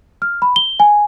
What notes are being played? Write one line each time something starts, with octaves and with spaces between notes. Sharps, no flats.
F6
B5
G7
G#5